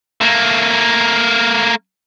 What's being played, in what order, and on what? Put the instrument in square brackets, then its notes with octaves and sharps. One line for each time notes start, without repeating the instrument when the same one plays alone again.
[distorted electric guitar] A3 A#3